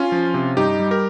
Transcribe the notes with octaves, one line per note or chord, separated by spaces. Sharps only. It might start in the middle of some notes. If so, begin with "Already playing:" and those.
Already playing: C#4 F4
F3
C3
G2 D#4 G4
G3
G4 A#4